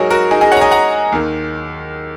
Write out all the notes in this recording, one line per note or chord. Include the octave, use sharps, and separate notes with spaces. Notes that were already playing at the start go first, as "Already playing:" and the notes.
Already playing: G#2 F#3 D#4 F#4 G#4 A#4 C#5
F#4 A#4
D#4 G#4
D#4 G#4
C#5 F#5
A#5
D#5 G#5
F#5 A#5
D#2 D#3 A#3